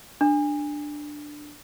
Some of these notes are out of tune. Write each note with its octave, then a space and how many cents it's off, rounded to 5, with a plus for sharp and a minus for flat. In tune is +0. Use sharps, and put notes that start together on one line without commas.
D4 +10